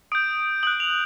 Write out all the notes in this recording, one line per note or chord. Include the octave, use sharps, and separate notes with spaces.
D#6 G6 D7
D#6 F#6 F#7
F7